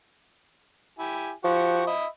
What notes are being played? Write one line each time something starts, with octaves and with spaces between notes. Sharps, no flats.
E4 G4 G#5
F3 F#4 G4 C#6
D#5 E5 B5